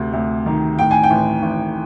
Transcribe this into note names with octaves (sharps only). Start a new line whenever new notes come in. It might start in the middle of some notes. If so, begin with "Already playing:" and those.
Already playing: D2 C3
D2
D#3
A2 G5
G#5
G5
A1
A1